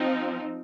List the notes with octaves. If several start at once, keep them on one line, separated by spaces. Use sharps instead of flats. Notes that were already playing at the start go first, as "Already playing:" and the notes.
Already playing: F3 C4 D#4